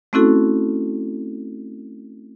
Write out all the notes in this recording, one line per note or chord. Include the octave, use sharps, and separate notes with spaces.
A3 C4 C#4 E4 F#4 A4